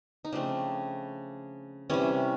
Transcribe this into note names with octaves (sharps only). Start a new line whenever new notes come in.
D#4
C#3 F3 A3 C4 D4
C3 E3 G3 C#4